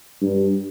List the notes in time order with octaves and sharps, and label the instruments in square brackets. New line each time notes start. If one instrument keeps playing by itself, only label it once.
[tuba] G2